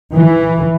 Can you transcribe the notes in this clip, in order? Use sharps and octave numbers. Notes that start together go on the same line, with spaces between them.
E3